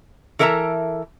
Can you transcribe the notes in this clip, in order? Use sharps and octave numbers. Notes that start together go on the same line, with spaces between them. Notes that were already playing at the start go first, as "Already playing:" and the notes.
E3 A4 A#4 E5 A5 A#5